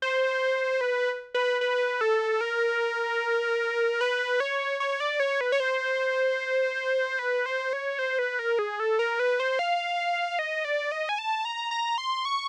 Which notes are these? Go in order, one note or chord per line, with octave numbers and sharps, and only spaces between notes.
C5
B4
B4
B4
A4
A#4
B4
C#5
C#5
D5
C#5
B4
C#5
C5
B4
C5
C#5
C5
B4
A#4
G#4
A4
A#4
B4
C5
F5
D#5
D5
D#5
G#5
A5
A#5
A#5
C6
C#6